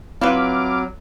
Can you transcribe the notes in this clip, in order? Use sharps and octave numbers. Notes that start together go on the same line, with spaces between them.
F#3 C4 E4 F4 B4 D6 F6